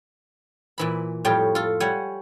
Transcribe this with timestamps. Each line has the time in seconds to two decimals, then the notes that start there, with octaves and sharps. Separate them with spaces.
0.78 A#2 E3 B5
1.25 F2 A2 G3 F4 C#5 G5
1.55 F4 A4
1.80 G3 C#5 F#5 G#5